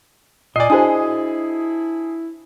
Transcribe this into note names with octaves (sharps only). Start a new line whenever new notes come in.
A#2 D5 D#5 G#5 C7
D4 E4 F#4 G#4 C5 A5 D#6